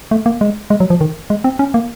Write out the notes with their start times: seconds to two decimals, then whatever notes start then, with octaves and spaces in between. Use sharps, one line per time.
0.11 A3
0.26 A#3
0.41 G#3
0.70 G#3
0.80 F#3
0.90 F3
1.01 D#3
1.30 G#3
1.44 C4
1.59 C#4
1.74 A#3